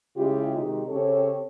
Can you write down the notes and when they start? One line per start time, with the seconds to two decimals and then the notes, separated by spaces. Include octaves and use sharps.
0.17 C#3 G#3 E4 F4 G4
0.57 C3 D#3 G#3 D#4 F#4 G4
0.89 C#3 C4 G4 A4 C#5